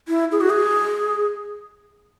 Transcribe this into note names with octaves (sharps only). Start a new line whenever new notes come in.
E4
G#4
F#4
G#4